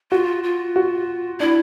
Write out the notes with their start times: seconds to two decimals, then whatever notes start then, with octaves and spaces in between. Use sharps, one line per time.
0.12 F4 F#4
0.43 F4
0.76 F#4
1.40 D4 E4